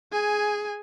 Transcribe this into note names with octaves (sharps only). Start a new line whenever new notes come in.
G#4 G#5